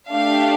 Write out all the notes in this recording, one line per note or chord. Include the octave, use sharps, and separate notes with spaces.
A3 D4 G4 F5